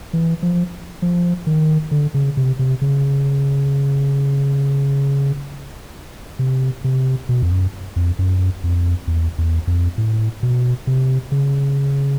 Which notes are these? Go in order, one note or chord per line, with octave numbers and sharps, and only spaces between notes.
E3
F3
F3
D#3
D3
C#3
C3
C3
C#3
C3
C3
B2
F2
F#2
F2
F#2
F2
E2
E2
F2
A2
B2
C3
C#3